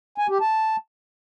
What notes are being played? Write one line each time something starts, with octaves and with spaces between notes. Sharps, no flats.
G#5
G4
A5